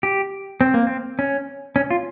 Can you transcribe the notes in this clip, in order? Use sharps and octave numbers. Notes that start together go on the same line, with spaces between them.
G4
C4
A#3
C4
C#4
C#4
F4